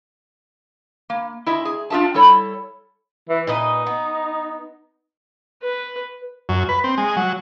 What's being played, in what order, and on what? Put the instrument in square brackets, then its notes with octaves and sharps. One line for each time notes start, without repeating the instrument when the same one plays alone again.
[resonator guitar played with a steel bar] A#3
E4 D#5 E5
G#4
D4 F4 G#4 E5 A5
G3 E4 A4 C#5
[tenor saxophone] E3
[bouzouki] A#2 B4 D#5 [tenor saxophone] D#4
[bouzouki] B3
[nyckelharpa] B4
[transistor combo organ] F#2
B4
C4
G#3
F#3